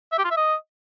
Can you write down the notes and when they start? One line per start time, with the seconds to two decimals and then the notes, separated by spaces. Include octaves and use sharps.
0.12 E5
0.18 G4
0.24 F4
0.31 E5
0.37 D#5